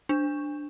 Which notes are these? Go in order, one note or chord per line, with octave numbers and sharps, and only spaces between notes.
D4